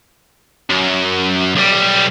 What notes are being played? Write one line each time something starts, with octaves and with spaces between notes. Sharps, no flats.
F#2
B1 G3